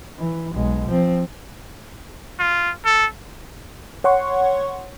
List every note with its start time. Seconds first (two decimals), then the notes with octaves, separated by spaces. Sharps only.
0.18 E3
0.54 B1 G#3
0.88 F3 C4
2.39 F4
2.85 A4
4.04 C#5 F#5 C6 C#6